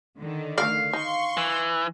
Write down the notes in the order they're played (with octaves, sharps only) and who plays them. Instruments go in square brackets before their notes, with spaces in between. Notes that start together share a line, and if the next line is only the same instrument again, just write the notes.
[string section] D3 D#3
[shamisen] A3 A#4 D5 [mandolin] F5
[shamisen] D#4 [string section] C6 C#6
[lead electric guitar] E3